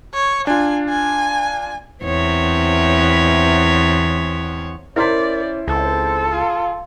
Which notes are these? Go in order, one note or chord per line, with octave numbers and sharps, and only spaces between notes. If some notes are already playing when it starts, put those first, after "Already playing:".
C#5
D4 F4 G#5
G#5
E2 C4 C#5
C#4 E4 A#4 C5 D5 B6
C#2 C4 A4
F4